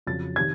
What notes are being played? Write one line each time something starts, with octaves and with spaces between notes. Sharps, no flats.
F2 C#3 F#3 A6
C3 D#3 G#6